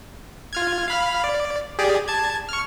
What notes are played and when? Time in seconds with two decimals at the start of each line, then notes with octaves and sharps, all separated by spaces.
0.53 F4 F6 G#6
0.88 F5 B5 F6
1.24 D5
1.79 G4 G#4 D5
2.08 A5 G#6
2.49 C#6 F6